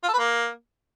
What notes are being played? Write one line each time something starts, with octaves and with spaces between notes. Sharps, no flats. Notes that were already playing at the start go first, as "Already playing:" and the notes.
F4
A4
B4
A#3